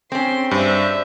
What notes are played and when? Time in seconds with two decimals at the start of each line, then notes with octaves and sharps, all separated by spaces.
0.12 C4 C#4 G#4 C5 C6
0.51 G2 G4 C5 D5 E5